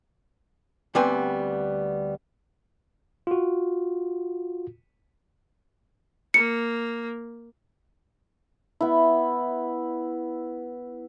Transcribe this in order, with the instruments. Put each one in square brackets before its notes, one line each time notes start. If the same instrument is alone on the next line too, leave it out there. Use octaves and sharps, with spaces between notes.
[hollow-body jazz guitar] D2 G3 B3 C4 B4 G#5
[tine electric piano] F4 F#4
[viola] A#3 [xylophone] C#7
[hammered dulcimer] B3 E4